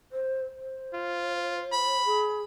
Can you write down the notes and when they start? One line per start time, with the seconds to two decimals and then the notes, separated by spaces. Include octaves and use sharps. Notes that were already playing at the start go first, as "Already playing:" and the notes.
0.12 C5
0.59 C5
0.93 F4
1.72 B5
2.05 G#4